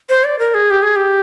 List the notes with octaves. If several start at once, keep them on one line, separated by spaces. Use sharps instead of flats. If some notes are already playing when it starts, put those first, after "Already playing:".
C5
D5
A#4
G#4
G4
G#4
G4